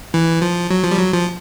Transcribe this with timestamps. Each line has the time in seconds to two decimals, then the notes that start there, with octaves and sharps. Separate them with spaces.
0.14 E3
0.42 F3
0.70 F#3
0.84 F3
0.91 G3
0.98 F#3
1.13 F3